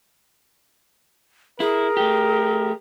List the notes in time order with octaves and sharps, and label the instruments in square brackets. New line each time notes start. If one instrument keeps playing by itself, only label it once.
[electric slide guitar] E4 [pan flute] G#4 [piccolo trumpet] A#4
[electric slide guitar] A3 G4